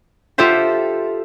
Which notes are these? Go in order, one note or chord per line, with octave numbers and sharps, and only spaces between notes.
F4 G4 A4 C5 E5